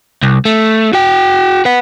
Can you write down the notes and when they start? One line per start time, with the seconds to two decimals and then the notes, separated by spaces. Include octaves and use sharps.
0.23 C2
0.45 A3
0.93 F#4 G5
1.65 B4 F#5